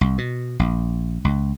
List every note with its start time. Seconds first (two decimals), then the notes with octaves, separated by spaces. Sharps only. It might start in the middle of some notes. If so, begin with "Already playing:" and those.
0.01 C2
0.18 B2
0.59 A#1
1.25 C#2